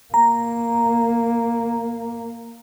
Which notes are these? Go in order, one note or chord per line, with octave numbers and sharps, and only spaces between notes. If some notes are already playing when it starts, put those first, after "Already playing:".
A#3 A#5